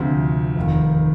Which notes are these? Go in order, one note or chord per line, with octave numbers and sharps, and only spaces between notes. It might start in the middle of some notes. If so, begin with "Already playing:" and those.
Already playing: D2 C3 F3
F1 D#2 D#3